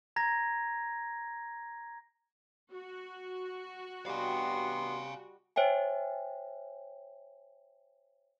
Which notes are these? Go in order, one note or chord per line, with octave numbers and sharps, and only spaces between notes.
A#5 G#6 A#6
F#4
G3 B3 D4 D#5 F5 G5 G#5 C6
C5 C#5 E5 G5 G#5